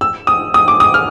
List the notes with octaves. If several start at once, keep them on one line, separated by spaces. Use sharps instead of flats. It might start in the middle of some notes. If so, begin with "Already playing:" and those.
E6
D#6
D#6
D6
D#6
F6